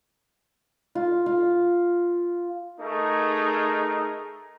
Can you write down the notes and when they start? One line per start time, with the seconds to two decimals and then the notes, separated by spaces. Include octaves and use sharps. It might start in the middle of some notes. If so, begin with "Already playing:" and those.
0.95 F4
1.26 F4
2.81 A3 D#4 G#4 A#4